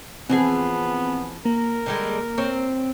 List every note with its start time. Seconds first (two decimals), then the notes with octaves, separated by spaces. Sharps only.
0.30 E3 F3 B3 C4 G#4
1.45 A#3 A#4
1.86 D3 G3 G#3
2.38 C4 C#5